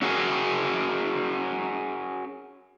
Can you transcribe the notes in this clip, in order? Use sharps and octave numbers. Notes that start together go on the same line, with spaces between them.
C#4 F#4 G#4 A#4